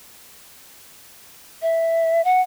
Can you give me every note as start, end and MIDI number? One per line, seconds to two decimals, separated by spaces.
1.62 2.24 76
2.25 2.41 78